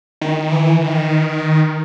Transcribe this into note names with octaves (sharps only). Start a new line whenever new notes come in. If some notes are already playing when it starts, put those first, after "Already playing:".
D#3
E3
D#3